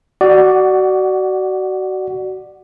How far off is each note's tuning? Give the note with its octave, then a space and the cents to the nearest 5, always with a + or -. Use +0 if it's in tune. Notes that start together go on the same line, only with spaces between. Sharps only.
F#4 +25 D5 +15 F#5 +0